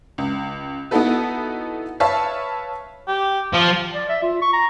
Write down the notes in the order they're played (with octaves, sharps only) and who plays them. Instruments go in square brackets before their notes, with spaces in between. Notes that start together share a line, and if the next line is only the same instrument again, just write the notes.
[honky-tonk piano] C#2
B3 D#4 E4 F#4 A4 B4
B4 C#5 E5 F5 A5 C#6
[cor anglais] G4
[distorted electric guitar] F3 [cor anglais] F5
[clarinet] D5
E5
F4
C#6
A#5